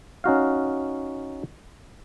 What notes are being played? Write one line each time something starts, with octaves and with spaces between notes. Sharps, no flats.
C#4 D#4 F#4 F5